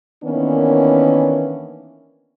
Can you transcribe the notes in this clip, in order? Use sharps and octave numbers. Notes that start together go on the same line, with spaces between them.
D#3 E3 A#3 B3 C#4 D4